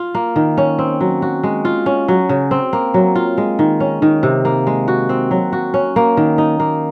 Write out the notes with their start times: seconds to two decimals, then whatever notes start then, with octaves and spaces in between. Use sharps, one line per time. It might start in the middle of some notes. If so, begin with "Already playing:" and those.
Already playing: F4
0.15 A#3
0.36 D#3
0.58 C#4
0.79 C4
1.01 F#3
1.22 F#4
1.44 G#3
1.65 F4
1.86 C#4
2.08 F#3
2.29 C#3
2.51 C4
2.73 A#3
2.94 F#3
3.15 F4
3.38 G#3
3.59 D#3
3.80 C#4
4.02 D#3
4.23 C3
4.45 A#3
4.67 G#3
4.88 F#4
5.09 C4
5.31 F#3
5.53 F#4
5.74 C#4
5.96 A#3
6.17 D#3
6.38 D#4
6.60 A#3